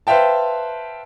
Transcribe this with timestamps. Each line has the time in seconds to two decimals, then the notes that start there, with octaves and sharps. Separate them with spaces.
0.07 B4 C5 E5 F5 G5 A5